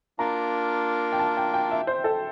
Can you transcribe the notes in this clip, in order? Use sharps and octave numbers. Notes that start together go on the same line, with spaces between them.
A#3 D4 F4 A#4 A#5
G5
A5
G5
G5
E5
C5
A4